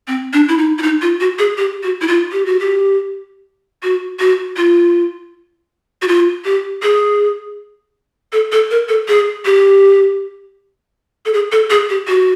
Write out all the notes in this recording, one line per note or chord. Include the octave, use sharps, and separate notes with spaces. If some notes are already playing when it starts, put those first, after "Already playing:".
C4
D4
E4
D#4
E4
D#4
F4
F#4
G#4
G4
F#4
E4
F4
G4
F#4
G4
F#4
F#4
F4
F#4
F4
G4
G#4
A4
A4
A#4
A4
G#4
G4
A4
G#4
A4
G#4
G4
F#4